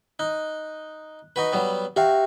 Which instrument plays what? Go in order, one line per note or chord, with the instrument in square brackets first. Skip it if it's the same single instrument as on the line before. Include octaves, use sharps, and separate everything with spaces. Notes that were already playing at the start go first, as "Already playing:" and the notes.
[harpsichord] D#4 [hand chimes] F#6
[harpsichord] D#4 F#4 B4
F#3 G3 B3
[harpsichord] F#4 F5 [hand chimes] G4 E5 G5